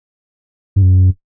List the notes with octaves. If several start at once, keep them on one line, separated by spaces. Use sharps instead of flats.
G2
F#2